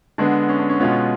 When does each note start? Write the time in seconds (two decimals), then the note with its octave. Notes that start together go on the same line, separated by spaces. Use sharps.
0.18 D3 G#3 B3 D4
0.49 C#4
0.59 D4
0.69 C#4
0.80 B2 G#3 B3 C#4 F4